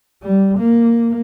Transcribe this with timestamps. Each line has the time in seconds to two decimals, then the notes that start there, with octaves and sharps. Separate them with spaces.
0.22 G3
0.58 A#3